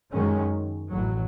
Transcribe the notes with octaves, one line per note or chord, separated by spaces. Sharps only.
F#2 D#3 G#3 C#4
A1 A2 F#3